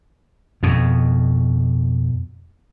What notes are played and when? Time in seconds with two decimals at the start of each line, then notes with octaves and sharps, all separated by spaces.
0.63 F2 B2